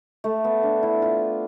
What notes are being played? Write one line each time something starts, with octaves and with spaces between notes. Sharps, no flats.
A3
B3
D4
E4
F4